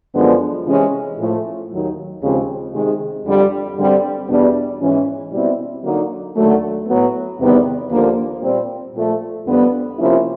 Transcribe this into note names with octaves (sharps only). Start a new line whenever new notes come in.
F#2 D3 F3 G#3 B3
C3 E3 G#3 C#4
A2 F3 A3
D#2 D#3 F#3
D#2 C#3 F3 G#3 C4
C3 D#3 G#3
F2 D3 G3
G2 D3 G3 C4
E2 B2 G3 B3 D4
G#2 E3 G#3 C#4
B2 G3 C4 E4
D3 F#3 A#3 D#4
D#2 D3 F#3 A3
A2 F#3 B3
E2 C3 D#3 G3 B3
D#2 D3 F3 A#3
A#2 G3 C4
A#2 F3 A3
F2 D3 G3 B3
C3 F3 A#3 C#4 E4